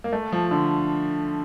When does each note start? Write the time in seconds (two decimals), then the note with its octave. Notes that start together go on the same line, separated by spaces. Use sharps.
0.04 A#3
0.13 A3
0.32 F3
0.51 D3